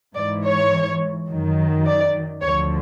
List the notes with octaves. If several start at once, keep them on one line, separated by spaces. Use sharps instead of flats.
G#2 E3 D5
C#5
F#2 D#3 F#3
D5
D2 D3 F3 C#5